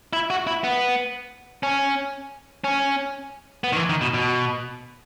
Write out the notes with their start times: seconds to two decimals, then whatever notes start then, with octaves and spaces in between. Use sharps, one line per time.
0.13 E4
0.30 F#4
0.47 E4
0.64 B3
1.63 C#4
2.64 C#4
3.64 B3
3.73 D#3
3.77 E3
3.89 D#3
4.01 B2
4.14 B2